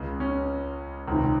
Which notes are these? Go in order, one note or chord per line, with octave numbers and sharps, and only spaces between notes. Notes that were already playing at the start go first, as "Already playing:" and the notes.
Already playing: C#2 C#3
C#4
C#2 C3 D#3